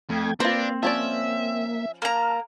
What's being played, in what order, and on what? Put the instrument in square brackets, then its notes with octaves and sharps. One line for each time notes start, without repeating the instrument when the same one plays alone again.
[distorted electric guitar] F2 [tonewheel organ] A3 G5 G#6
[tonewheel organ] A#3 [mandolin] C4 [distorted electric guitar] D4 [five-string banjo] F4 B4
[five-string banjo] F3 C#4 D5 [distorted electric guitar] E5
[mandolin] A#3 A#5 [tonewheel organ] A5 F6